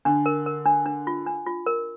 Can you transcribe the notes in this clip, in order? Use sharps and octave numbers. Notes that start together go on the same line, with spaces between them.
D3 D4
A#4
A#4
D4
D4
F4
D4
F4
A#4